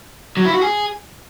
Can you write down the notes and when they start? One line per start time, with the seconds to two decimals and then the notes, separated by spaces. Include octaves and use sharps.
0.37 F#3
0.45 E4
0.54 F#4
0.62 G#4